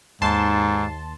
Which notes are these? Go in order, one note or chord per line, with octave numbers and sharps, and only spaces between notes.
D#2 G#2 A5 C6